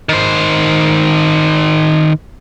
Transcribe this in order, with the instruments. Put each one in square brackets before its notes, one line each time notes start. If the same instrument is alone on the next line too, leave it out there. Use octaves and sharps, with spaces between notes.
[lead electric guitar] D#3 C5